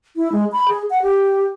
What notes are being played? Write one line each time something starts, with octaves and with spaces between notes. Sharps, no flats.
E4
G#3
B5
G#4
F#5
G4